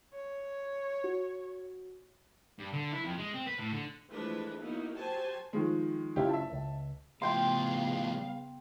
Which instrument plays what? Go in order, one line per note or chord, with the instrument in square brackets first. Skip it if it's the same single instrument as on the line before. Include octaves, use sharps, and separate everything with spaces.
[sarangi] C#5
[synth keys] F#4
[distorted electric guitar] G2
D3
E4
F2
G#3
C4
B4
A2
D3
[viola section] E3 F3 G#3 A3 D4 B4
F#3 A#3 B3 D#4 E4
F#3 G4 C5 G#5 A5
[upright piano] D#3 F3 G#3
[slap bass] F#1 C4 C#4 [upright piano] E4 F4 G4
[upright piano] E5 A5
[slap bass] C#2
[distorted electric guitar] A2 F3 [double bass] C#3 B3 [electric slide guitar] F5 [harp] G5 C6